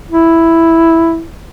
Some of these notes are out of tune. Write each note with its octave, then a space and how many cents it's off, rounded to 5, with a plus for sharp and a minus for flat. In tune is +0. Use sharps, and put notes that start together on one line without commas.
E4 +0